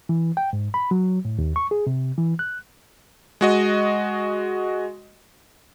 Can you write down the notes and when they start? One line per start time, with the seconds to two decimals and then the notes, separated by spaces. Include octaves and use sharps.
0.09 E3
0.37 G5
0.53 G#2
0.74 B5
0.91 F#3
1.25 A2
1.39 D#2
1.56 C#6
1.71 G#4
1.87 C3
2.18 E3
2.39 F#6
3.41 G#3 F#4 D#5